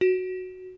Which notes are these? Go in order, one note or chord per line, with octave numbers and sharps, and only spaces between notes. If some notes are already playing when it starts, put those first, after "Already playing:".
F#4